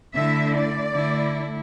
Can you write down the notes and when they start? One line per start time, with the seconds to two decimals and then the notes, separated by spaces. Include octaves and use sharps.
0.14 D3 A3 E4 E5
0.54 D5
0.93 D3 A3 E4